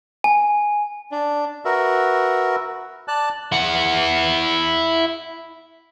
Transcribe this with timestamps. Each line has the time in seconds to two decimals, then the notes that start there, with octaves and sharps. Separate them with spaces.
0.24 G#5
1.12 D4
1.65 F#4 A#4 B4 E5
3.08 D5 A5 F#6
3.52 E4 F#5